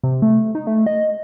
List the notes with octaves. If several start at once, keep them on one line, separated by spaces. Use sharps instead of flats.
C3
A3
D#4
A3
D#5